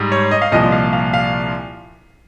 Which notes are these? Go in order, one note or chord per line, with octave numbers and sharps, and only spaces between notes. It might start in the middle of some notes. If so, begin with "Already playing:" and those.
Already playing: G#2 G3
C#5
D#5
F5
C2 A#2 F3 D#5
F5
F5
F5